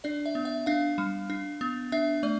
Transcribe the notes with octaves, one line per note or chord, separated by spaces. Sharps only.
D4 D5
E5
B3
E5
D4 F5
G3
D4
B3
D4 E5
A3 D5